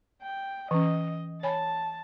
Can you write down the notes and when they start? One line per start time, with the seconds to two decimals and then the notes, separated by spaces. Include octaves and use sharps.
0.23 G5
0.71 E3 C#4 D#5
1.43 C#5 G#5 A5 B5